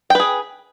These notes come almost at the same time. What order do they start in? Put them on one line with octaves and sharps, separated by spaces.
G5 B4 G#4